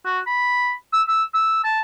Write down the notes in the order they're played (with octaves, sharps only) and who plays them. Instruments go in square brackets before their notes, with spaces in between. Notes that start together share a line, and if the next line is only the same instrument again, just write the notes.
[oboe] F#4
B5
E6
E6
E6
A5